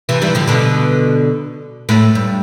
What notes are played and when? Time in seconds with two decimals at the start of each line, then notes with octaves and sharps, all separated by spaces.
0.09 C3 E3
0.22 E3 G3
0.35 D3 F3
0.47 B2 D3
1.89 A2
2.15 G2